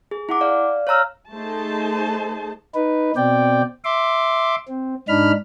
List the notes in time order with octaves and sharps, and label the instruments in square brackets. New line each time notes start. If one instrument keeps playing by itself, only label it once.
[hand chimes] G#4
E4 F#5 D6
D5 F5
C#5 F5 A#5 E6 F6
[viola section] A3 D#4 G#4 C5 A5
[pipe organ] D#4 B4
B2 C4 D5 G5
E5 C6 D6
C4
G#2 D4 D#4 B5 F6